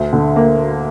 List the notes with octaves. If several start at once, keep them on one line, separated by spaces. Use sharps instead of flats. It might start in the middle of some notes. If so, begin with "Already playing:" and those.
Already playing: D2
D3
A#3